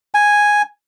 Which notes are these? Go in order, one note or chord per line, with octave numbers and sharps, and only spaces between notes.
G#5